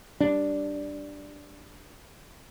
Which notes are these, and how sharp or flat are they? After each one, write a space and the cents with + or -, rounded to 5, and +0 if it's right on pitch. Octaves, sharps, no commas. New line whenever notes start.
G3 +0 D4 +0